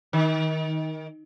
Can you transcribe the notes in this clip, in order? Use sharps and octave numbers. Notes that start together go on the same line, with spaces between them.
D#3